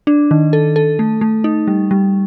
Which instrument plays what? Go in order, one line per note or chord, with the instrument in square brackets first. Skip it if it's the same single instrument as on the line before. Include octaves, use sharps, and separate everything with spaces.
[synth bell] D4
D#3
A4
A4
A3
A3
D#4
G3
G3